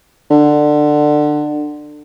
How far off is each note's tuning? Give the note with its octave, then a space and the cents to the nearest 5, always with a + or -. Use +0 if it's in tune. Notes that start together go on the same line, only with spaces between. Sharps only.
D3 +20